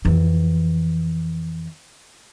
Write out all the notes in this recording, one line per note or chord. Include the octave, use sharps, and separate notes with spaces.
F2 E3